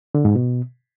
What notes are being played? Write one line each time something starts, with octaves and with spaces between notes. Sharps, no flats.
D3
G#2
B2